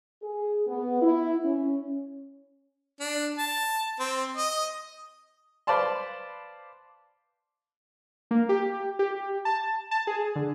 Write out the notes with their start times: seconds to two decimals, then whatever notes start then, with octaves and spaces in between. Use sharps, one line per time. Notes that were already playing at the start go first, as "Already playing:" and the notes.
0.23 G#4
0.67 B3
1.02 E4
1.44 C#4
3.00 D4
3.38 A5
3.99 C4
4.37 D#5
5.67 B4 C5 D5 F5 A5 C6
8.31 A#3
8.49 G4
8.99 G4
9.45 A5
9.91 A5
10.07 G#4
10.36 D3